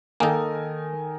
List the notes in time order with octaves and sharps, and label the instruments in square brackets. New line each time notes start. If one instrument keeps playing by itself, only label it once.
[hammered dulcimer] D#3 [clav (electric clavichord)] A#3 D#4 [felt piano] A4 A#4 G#5